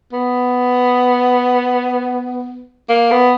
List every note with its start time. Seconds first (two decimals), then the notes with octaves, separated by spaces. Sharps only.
0.13 B3
2.89 A#3
3.11 B3